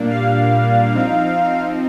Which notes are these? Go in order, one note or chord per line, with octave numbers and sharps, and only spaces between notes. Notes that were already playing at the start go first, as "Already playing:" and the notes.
Already playing: A#2 G3 A#3 D4
F5
F3 C4 D#4